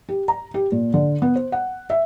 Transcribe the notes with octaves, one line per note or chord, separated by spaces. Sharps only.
G4
A#5
G4
A#2
D3
B3
C5
F#5
E5